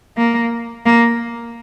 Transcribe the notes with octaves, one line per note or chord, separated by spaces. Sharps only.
A#3
A#3